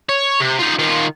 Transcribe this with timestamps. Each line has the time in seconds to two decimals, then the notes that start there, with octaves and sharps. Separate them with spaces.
0.09 C#5
0.40 C3
0.59 D#4 F4
0.79 D#3 F4